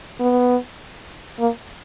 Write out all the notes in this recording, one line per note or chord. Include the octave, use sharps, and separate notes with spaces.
B3
A#3